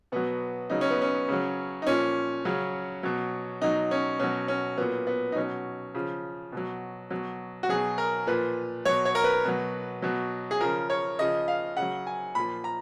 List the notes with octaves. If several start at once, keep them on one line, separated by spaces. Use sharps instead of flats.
B2 F#3 B3
C#3 F#3 D#4
C#4
B3
C#4
C#3 F#3
D#4
A#2 F3 C#4
C#3 F#3
B2 F#3
B2 F#3 D#4
C#4
B2 F#3 C#4
C#4
A#2 F#3 B3
B3
D#4
B2 F#3 C#4
C#3 F3
B2 F#3
B2 F#3
F#4
B2 F#3 G#4
A#4
A#2 F3 B4
B2 F#3 C#5
C#5
A#4
B4
B2 F#3
B2 F#3
G#4
C#3 F3 A#4
C#5
C#3 F3 D#5
F5
C#3 F#5
F#3
G#5
A#2 F3 B5
A#5